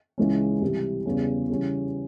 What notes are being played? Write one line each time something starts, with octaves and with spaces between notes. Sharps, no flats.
C#2 C#3 E3 G#3 C#4
C3 E3 G3
E2 C#3 G3 C#4
C#3 E3 G3 C#4